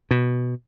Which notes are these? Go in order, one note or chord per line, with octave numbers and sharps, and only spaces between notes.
B2